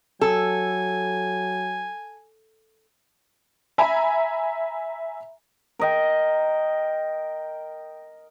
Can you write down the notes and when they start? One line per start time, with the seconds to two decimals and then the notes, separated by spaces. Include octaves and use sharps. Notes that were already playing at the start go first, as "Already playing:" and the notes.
0.21 F#3 A4 G#5
3.78 E5 G#5 A#5 B5
5.79 A#4 D#5 G5